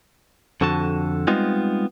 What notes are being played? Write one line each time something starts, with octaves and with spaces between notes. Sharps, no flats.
F2 D3 F#4 A5
G3 G#3 B3 C4 D#4 F4